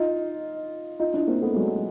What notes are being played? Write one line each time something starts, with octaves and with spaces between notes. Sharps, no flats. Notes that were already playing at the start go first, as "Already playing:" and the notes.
Already playing: D#4 F4
D#4 F4
D4 E4
A#3 C4
A3 B3
F#3 G#3